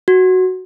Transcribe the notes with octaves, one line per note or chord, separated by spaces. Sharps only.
F#4